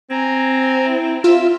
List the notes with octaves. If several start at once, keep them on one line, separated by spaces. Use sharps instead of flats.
C4 G#5 A#5
E4
F4 E5 E6